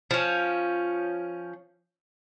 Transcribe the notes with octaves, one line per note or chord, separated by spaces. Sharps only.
F3 C#4